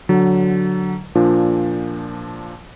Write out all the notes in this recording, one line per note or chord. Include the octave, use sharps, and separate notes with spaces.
D3 F#3
A#2 F3 D4